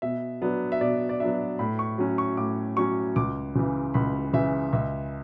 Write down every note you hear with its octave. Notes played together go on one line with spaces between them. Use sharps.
B2 E5
F#3 B3 D4
E5
B2 D5
D5
F#3 B3 D4 E5
A2 B5
C#6
F#3 C#4
C#6
A2 D6
F#3 C#4 C#6
C#2 D6
C#3 E3
C#2 B5
C#3 E3 E5
C#2 E5